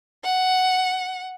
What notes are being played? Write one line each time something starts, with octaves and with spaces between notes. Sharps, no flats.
F#5